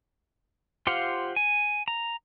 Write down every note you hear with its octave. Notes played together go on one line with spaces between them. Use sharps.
F4 G4 C5 F5 F#5
G#5
A#5